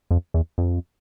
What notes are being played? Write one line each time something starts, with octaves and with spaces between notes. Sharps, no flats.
F2
E2
F2